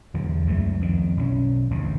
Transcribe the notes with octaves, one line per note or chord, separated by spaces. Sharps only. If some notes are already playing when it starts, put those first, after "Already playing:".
E2 D3 E3 F#3
C#2 F#2 C#3 A3
F2 D#3
B1 E3 C#4
A1 D2 G#2 B2